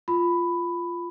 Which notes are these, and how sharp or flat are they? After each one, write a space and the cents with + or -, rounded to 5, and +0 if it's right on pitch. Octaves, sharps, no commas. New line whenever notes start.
F4 -5 B5 +10